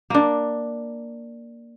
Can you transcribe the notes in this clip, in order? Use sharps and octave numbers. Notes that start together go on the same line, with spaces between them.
A#3 D4